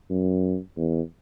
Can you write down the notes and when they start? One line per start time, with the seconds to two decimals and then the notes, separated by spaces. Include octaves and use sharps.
0.10 F#2
0.77 E2